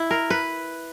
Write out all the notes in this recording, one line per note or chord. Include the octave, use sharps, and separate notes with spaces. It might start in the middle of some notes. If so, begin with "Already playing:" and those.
Already playing: E4
A#4
B4